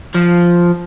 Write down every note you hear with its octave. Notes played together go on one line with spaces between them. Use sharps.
F3